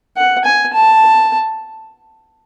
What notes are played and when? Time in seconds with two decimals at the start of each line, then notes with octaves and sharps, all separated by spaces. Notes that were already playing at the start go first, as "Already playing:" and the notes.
0.17 F#5
0.45 G#5
0.74 A5